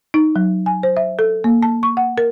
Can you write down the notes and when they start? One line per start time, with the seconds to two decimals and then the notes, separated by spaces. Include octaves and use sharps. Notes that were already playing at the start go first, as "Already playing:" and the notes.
0.14 D#4
0.36 F#3
0.66 G#5
0.83 C5
0.97 E5
1.19 A4
1.44 A#3
1.63 A5
1.83 C#6
1.97 F#5
2.18 A#4